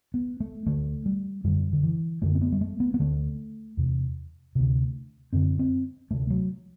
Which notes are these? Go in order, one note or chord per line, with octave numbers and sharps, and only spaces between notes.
B3
A3
D2 D3 A3
G3
F#2 D3 G3
D3
E3
F#2 D3 A3
C4
B3
G3
A3
B3
B3
D2 D3 A3
E2 C3
D2 C3
F#2 D3 C4
C4
D2 C3 A3
F#3